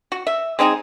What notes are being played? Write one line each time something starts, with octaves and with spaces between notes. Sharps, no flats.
F#4
E5
G#3 C4 D#4 G#4